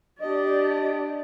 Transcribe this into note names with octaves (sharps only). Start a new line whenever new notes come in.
D4 G4 D5 D#5